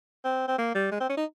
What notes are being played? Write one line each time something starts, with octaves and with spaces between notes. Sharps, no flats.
C4
C4
A#3
G3
G#3
C4
C#4
D#4